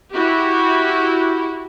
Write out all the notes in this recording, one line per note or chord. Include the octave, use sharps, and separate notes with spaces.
E4 F#4 G4